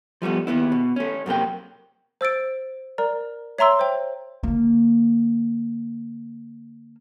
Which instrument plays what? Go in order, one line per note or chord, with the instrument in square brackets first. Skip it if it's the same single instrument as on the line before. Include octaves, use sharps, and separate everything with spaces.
[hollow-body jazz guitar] F3 G3 A3 B3
D#2 G#2 B3 E4
B2
A3 C#4
F#2 C3 A#3 G5
[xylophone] C5 E6 A6 D7
A#4 D5 A#5
C#5 E5 A#5 C6 E6
C5 G5
[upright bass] D3 A#3